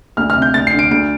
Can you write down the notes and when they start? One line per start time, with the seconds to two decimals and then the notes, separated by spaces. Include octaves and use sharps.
0.17 D2 F6
0.30 F6
0.36 C3
0.42 G6
0.54 D2 A6
0.67 C7
0.73 D3
0.79 D7
0.91 D2 D7